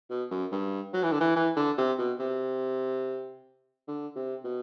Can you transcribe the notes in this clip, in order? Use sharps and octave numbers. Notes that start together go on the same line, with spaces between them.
B2
F#2
G2
F#3
E3
D3
E3
E3
D3
C3
B2
C3
D3
C3
B2